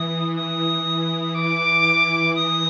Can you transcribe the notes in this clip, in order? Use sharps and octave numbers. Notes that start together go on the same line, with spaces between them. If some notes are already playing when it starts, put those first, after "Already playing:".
Already playing: E3 D#6
E3 D#6
E3
D6
E3
D#6